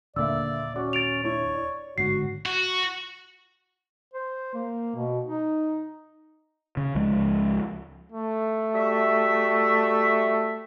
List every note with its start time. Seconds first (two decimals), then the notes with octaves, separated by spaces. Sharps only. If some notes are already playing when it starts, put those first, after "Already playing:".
0.16 D#1 D3 A#3 D5 E5 E6
0.76 C#4 F#4 D6
0.93 A6 D7 F7
1.24 D4 E4 C#5
1.54 D5
1.98 G1 G#2 D3 F#4 C7
2.46 F#4
4.13 C5
4.54 A#3
4.95 B2
5.24 D#4
6.77 C#3
6.95 C#2 F3 G#3
8.12 A3
8.72 G3 F#4 E5